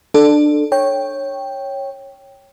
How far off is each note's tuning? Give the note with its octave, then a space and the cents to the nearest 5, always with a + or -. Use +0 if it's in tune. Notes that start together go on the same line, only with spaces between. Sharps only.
D4 +20 A4 +0
C#5 -10 G5 +0